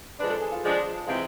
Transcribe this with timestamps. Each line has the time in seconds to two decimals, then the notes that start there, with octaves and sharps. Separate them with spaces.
0.20 F3 G#3 D4 B4
0.30 A4
0.42 G#4
0.52 F4
0.63 F3 G#3 D4
1.07 C3 E3 G#3 C4 F4